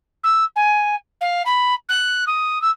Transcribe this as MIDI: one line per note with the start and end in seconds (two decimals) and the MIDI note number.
0.24 0.44 88
0.56 0.95 80
1.21 1.42 77
1.46 1.74 83
1.89 2.25 90
2.27 2.61 87
2.62 2.71 88